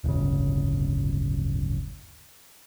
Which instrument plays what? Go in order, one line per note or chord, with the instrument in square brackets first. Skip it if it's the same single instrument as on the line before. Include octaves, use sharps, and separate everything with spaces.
[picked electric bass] D1 G1 C#3